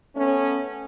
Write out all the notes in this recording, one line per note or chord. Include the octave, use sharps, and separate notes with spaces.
A3 B3 C#4